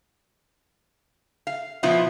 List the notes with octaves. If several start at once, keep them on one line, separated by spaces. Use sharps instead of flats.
F5
B2 F3 B3 E4 F4